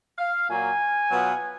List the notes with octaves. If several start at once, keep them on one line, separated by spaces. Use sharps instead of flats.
F5
A#2 F#3 A#3 F4 G#5
B2 F#3 B3 F4